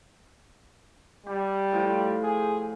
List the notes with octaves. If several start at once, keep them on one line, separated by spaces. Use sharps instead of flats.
G3 G4
A2 F3 G5
G#4